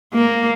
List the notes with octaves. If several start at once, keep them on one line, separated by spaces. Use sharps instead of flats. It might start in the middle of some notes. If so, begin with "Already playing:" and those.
A#3